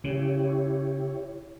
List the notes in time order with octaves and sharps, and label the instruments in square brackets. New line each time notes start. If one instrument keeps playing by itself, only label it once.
[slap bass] C#3 [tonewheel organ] E4 G4 C#5